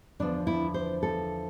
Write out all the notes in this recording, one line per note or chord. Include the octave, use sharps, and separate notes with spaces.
E2 D3 F3 D4
E4
C5
A4